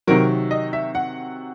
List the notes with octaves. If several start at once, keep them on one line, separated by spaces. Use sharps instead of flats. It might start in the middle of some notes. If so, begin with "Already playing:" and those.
C3 D#3 F#3 A#4
D#5
E5
F#5